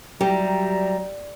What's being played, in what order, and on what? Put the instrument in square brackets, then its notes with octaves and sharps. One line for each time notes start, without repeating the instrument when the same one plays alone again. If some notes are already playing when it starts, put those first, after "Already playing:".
[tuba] F#3 [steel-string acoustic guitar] G3 [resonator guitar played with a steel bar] G4 [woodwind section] D5 E5 A#5